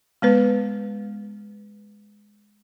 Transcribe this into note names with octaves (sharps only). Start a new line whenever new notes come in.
G#3 B3 B4